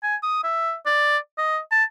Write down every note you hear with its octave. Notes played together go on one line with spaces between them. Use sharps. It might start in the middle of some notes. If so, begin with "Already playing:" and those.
G#5
D#6
E5
D5
D#5
A5